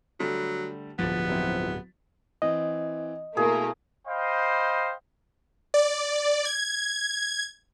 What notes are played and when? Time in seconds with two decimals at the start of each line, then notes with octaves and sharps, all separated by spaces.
0.20 D3 F#3 G3 A3
0.99 D1 G2 F3 B3 A6
1.29 F#3 C4 E4
2.42 E3 C4 D#5
3.37 B2 A3 A#3 E4 G#4 A#4
4.06 C5 D#5 F5 G5 B5
5.74 D5
6.45 G#6